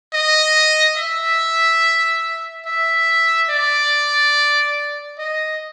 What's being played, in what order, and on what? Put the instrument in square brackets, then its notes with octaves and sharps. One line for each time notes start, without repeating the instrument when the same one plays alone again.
[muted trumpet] D#5
E5
E5
D5
D#5